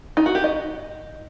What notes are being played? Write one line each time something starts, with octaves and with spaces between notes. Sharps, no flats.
D#4
F#4
G4
D#5